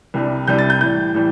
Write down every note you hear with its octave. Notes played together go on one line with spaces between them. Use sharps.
C2 C3 G3 D4
C2 C3 G3 D4 G6
A6
G6
A2 E3 G3 G6
A2 E3 G3